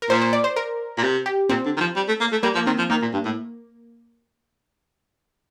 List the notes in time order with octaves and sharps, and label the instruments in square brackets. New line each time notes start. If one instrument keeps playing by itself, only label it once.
[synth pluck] A#4
[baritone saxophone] A#2 [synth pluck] C5
[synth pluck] C5
D5
C5
A#4
[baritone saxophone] A#2
C3
[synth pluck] G4
[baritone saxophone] A#2 [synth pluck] C4
[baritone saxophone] D3
D#3
F3
G3
A3
A#3
A3
[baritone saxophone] G3 [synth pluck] A#3
[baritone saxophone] F3 [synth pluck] A#3
[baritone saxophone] D#3 [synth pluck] C4
[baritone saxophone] F3
[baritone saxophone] D#3 [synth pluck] A#3
[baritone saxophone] A#2
G2
A2